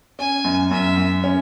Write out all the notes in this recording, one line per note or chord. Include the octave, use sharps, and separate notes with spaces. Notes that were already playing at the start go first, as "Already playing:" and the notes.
C#4 G#5
F#2
F#2 E5
F#2
C#4